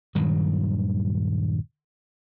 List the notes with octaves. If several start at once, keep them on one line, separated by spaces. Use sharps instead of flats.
D#1 G2 D#3 F#3